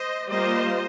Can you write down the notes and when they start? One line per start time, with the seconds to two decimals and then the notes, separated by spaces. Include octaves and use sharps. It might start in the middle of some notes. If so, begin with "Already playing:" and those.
Already playing: C5 D#5
0.29 G3 A#3 F4 C5 D#5